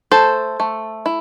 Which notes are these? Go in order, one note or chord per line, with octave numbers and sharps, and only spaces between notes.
A3 A4 C5
A3
E4